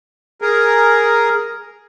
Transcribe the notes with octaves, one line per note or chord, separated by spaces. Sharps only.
G#4 A#4